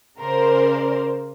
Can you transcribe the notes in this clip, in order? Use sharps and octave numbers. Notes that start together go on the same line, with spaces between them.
C#3 A#4 C5 D5